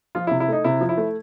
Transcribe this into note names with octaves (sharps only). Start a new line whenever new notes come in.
F3 F4
E4
C3
E4
A3 D#4
C3 E4
F3
E4
A3